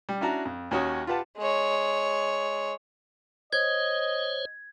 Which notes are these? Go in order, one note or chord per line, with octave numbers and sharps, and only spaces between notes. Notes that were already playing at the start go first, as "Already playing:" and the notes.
G3
C#4 D4 E4 F#4 A5 A#5
F2
D#2 C#4 F#4 C#5 G5 D#6
F4 G4 B4 F#5 A5
G#3 C#5
C5 C#5 D#5 G#6